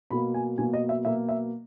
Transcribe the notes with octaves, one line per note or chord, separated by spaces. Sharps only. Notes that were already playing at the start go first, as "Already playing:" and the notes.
B2 F#3 A#3 B5
G#5
B2 F#3 A#3 G#5
D#5
E5
B2 F#3 A#3 E5
E5